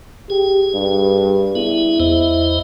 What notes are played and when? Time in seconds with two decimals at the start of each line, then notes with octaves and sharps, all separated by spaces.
0.30 G4 G#4
0.74 G2
1.55 B3 E4 G#4
2.00 E2 C5 D#5